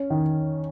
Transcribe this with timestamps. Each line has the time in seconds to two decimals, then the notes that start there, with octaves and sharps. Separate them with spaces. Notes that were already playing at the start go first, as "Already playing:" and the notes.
Already playing: C#4
0.10 D#3